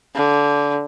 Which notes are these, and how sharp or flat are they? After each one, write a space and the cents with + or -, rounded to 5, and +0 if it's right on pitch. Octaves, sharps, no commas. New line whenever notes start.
D3 -20